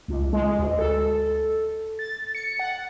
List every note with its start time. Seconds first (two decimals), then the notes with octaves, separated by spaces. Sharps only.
0.08 C#2
0.33 G#3
0.59 D2
0.79 A4
1.99 A6
2.35 C#7
2.59 F#5